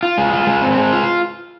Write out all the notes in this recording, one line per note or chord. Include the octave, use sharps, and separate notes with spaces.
F4
G#3
F4
G#3
C4
G#3
F4